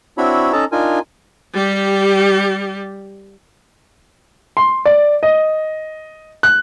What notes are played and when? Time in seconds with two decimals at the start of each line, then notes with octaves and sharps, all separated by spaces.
0.18 C4 D4 E4 F#4 C#5 B5
0.52 C#4 D#4 A4 D#5 A5 A#5
0.72 D4 D#4 F4 A#4 G#5
1.54 G3 G4
4.57 C6
4.86 D5
5.23 D#5
6.43 F#6